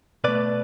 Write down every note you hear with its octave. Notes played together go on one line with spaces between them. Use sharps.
B2 A3 B4 D5